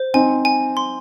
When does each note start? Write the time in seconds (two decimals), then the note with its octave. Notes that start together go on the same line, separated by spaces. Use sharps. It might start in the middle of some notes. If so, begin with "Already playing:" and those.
Already playing: C5
0.14 C4 D#4 G#5
0.45 G#5
0.77 C6